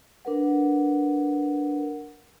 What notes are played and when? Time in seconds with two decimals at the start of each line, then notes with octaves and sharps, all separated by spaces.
0.25 D4 A#4 B4 F#5